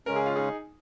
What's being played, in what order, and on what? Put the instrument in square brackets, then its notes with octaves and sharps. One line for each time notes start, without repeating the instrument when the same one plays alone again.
[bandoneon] C#3 G#3 C#4 [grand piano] A#4
[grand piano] G#4
F4
D#4 G#4